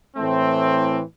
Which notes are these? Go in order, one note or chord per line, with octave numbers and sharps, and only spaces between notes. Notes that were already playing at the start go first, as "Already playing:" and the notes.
A2 E3 A3 C4